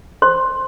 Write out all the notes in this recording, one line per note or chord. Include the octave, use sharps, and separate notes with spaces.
C5 C6